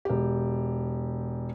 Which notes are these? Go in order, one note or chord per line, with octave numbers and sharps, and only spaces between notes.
E1 G4